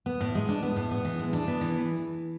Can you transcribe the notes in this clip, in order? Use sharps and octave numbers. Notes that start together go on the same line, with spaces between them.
B3
A2
G#3
D4
B3
A2
B3
E3
G#3
D4
B3
E3